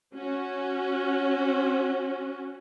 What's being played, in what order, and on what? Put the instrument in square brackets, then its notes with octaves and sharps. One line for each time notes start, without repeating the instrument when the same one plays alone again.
[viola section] C#4 F#4